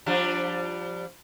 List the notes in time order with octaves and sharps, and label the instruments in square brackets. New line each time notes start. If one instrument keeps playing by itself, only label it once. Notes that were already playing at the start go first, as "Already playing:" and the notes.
[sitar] F3 G3 D4